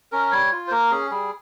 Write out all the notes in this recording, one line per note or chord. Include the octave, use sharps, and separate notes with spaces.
C#4 A#4
G3 C#5
F4
C5
A#3 A#4
C#4 G#4
G3 G#4